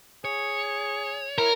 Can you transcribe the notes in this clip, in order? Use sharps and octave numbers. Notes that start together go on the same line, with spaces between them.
G#4 C#5
E4 A#4